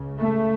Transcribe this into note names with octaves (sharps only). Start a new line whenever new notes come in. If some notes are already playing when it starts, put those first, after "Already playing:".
Already playing: C#2 C#3
A3